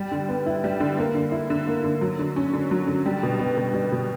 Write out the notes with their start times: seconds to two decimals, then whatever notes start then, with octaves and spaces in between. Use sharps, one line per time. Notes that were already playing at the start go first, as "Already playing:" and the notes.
Already playing: G3
0.11 D3
0.29 B3
0.46 E4
0.64 G3
0.80 D3
0.98 A#3
1.15 D3
1.32 E4
1.50 D3
1.67 A#3
1.84 D3
2.01 F#3
2.19 D3
2.36 C#4
2.53 D3
2.71 F#3
2.87 D3
3.06 G3
3.23 B2
3.39 B3
3.57 B2
3.74 G3
3.92 B2